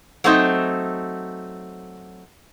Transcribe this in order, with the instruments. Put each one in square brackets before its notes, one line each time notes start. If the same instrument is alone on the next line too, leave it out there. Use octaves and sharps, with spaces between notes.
[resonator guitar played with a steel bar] F#3 A3 C4 D#4